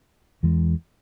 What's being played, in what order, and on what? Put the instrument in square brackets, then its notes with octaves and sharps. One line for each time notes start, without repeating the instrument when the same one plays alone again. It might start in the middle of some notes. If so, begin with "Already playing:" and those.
[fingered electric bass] E2 E3 G#3